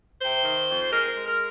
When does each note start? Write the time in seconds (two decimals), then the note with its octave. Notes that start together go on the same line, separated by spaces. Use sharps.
0.20 C3 C5
0.44 D#3
0.68 F2
0.91 G#3 A#4
1.14 G#3
1.27 A#4